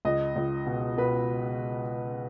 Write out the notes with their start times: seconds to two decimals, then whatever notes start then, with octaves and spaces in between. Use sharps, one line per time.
0.05 C#2 D#5
0.36 C#2
0.67 B2
0.97 B2 B4